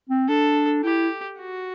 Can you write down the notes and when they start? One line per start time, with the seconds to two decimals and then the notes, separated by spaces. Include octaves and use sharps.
0.10 C4
0.28 D4 A4
0.84 E4 G4
1.39 F#4